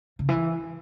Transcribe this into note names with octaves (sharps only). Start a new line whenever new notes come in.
C#3
E3